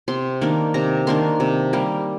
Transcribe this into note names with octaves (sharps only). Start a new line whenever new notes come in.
C3 C6
D#3 A#3 D4
C3 A#5
D#3 A#3 D4 C6
C3
G3 A#3